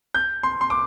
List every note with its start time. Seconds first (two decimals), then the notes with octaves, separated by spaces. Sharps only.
0.14 G6
0.43 C6
0.61 C6
0.70 D6